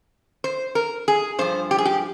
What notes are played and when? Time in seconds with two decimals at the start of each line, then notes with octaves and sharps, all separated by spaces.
0.44 C5
0.75 A#4
1.08 G#4
1.39 G2 F3 C5
1.71 G4
1.78 G#4
1.85 G4